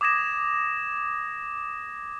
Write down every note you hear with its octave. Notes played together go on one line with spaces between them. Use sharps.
D6 D#6 G#6 A#6 E7